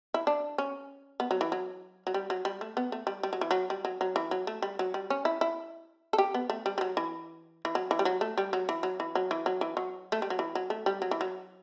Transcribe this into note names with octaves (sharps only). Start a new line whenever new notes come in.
E4
D4
C#4
B3
F#3
E3
F#3
F#3
G3
F#3
G3
A3
B3
A3
G3
G3
F#3
E3
F#3
G3
F#3
F#3
E3
F#3
A3
G3
F#3
G3
C#4
E4
E4
A4
G4
B3
A3
G3
G3
F#3
E3
E3
F#3
E3
G3
F#3
A3
G3
F#3
E3
F#3
E3
F#3
E3
F#3
E3
F#3
A3
G3
F#3
E3
F#3
A3
G3
F#3
E3
F#3